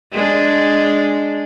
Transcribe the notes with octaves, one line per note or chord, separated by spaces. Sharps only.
G#3 D4